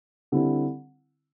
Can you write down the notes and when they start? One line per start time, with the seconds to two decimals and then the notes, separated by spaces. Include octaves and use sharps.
0.32 D3 G3 C4 E4